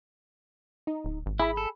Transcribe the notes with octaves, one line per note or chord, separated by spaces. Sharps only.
D#4
D1
G#1
E4 G#4 B5
A4